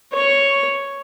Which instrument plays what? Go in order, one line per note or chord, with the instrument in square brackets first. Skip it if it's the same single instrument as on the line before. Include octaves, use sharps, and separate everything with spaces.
[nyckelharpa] C#5